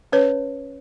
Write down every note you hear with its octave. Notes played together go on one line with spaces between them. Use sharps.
C#4 B4 C#5